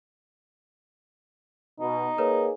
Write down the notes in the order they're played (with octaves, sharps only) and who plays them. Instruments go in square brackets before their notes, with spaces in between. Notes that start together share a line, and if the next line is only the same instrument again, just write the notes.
[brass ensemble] B2 [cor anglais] D#4
[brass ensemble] A#3 G#4 [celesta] A#4 B4 C#5